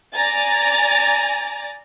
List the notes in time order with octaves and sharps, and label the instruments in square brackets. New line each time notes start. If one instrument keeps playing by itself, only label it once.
[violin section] D5 G#5 A#5 A6